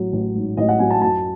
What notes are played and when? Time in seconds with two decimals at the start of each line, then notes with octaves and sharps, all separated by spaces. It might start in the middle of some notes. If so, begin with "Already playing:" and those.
Already playing: A1 F#3
0.13 A1
0.35 G#2
0.57 A1 D#5
0.69 F#5
0.79 F#3 G#5
0.90 A5
1.02 F#2 A5